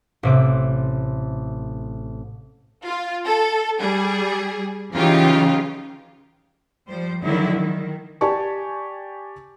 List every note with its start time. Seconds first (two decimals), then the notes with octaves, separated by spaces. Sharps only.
0.23 A1 C3 D6
2.85 F4
3.26 A4
3.80 G3 G#4
4.94 C#3 E3 F#3 D#4 F4 G4
6.87 F3 G3 C5
7.22 D3 D#3 F3 F#3 G#3 E4
7.57 D#3
8.21 G4 D5 G#5 A5 C#6